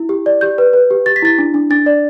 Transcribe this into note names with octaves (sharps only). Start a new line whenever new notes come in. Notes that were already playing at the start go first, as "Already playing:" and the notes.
Already playing: E4
G4
D5
G4 G6
B4
B4
G4
G4 A6
B6
E4 A6
D4
D4
D4 A6
D5